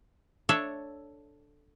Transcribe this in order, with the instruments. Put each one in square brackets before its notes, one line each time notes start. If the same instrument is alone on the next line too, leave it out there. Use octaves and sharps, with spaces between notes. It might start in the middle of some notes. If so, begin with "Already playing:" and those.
[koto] D4 A4 C#5 E5